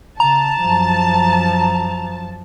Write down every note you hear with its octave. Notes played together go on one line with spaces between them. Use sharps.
C#3 A5 A#5
F#2 F3